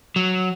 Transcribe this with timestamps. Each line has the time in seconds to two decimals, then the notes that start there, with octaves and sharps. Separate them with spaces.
0.16 F#3